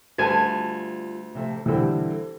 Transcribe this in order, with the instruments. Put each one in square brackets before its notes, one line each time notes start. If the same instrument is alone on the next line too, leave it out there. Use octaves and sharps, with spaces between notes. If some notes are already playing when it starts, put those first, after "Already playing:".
[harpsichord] D2 G#5 [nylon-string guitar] G3 F4 A5
[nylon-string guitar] C3 F3 A3
[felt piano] D3 E3 [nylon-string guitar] G3 C4 G4